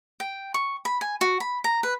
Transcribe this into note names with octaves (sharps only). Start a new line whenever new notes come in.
G5
C#6
B5
G#5
F#4
B5
A#5
B4